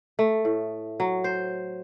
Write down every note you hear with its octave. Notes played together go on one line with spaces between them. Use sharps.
A3
A2
F#3
C5